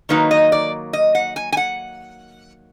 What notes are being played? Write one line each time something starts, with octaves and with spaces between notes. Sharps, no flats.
D#3 F#3 A#3 D#4 B4
D#5
D5
D#5
F#5
G#5
G#5
F#5